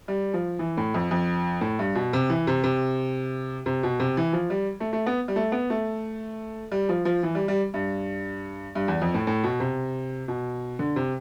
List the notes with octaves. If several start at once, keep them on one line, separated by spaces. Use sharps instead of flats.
G3
F3
E3
A2
F2
F2
A2
G2
B2
C3
E3
C3
C3
C3
B2
C3
E3
F3
G3
A3
A3
B3
G3
A3
B3
A3
G3
F3
F3
E3
G3
G3
G2
G2
E2
F2
A2
A2
B2
C3
B2
D3
C3